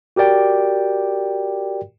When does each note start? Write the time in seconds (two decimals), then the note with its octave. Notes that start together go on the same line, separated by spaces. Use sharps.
0.16 F#4 G4 A#4 D5 G5